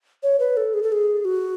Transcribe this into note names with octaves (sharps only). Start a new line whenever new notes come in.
C#5
B4
A4
G#4
A4
G#4
F#4